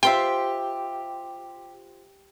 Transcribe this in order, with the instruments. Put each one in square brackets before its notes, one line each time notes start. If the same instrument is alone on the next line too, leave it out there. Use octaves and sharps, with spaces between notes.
[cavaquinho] F4 C5 E5 [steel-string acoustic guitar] G4 [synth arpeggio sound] G5